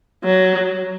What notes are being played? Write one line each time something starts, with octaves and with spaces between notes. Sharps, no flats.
F#3